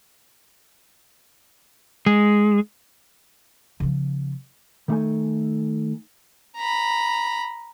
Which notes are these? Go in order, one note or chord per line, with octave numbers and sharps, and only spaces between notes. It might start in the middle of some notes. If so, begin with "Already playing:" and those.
G#3
C#3 F3
D#3 G3 A3 D#4 A4 G#5
A#5 B5